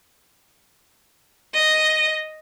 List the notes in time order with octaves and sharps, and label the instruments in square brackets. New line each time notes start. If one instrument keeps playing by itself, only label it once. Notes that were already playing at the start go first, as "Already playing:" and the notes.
[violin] D#5